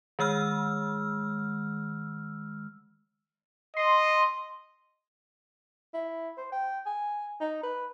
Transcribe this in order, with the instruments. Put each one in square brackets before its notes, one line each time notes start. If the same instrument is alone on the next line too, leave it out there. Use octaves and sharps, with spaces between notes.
[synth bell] D#3 G#3 E6 F6
[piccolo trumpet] D#5 [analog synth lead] C6
[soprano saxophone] E4
C5
G5
G#5
D#4
B4